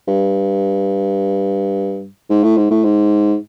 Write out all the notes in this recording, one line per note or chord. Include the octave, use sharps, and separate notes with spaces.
G2
G#2
A2
G#2
A2
G#2